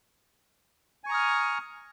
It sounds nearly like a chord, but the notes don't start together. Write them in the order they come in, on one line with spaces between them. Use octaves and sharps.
G#5 C#6 A#5 D#6 F6